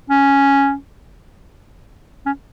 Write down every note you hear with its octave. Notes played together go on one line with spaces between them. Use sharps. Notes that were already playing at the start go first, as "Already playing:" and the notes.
C#4
C#4